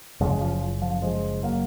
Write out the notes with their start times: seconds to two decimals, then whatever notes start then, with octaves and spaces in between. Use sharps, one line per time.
0.21 F#1 F#2 C#3 F3 G#3
0.41 F3
0.82 F3
1.02 F3 G#3
1.43 F#3 A#3